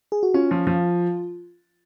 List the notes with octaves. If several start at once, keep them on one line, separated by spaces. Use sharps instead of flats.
G#4
F#4
C#4 F4
F3
F3